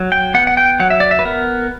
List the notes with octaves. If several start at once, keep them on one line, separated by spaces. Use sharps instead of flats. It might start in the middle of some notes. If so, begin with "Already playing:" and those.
Already playing: F#3
G5
B3 F#5
F#5
G5
F#3 F#5
E5
D5
E5
B4
B3 A#4